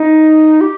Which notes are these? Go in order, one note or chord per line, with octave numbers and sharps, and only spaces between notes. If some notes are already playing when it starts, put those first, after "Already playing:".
Already playing: D#4
G4